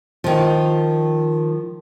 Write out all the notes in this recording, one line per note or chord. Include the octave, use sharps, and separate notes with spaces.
D#3 F3